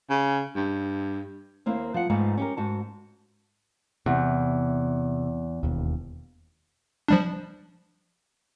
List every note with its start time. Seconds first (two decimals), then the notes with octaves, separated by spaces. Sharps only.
0.10 C#3
0.56 G2
1.66 D#2 A#3 C4 E4
1.94 F3 F#5
2.10 G#2 F3 A3 B3 C4 D#4
2.38 C#4 G4 A#4
2.57 G#2 F#4 A5
4.06 E2 C3
5.63 E1 D#2
7.08 F3 G3 D4